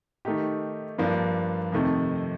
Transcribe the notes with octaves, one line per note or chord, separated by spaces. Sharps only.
D#3 A3 D#4 G4
G2 F3 A#3 D4
F2 C3 D#3 A3